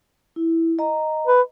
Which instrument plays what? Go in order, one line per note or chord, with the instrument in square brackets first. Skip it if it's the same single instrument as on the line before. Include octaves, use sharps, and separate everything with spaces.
[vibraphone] E4
D#5 A#5
[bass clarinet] B4